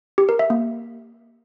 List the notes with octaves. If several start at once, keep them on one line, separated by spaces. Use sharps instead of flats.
G4
A#4
E5
A#3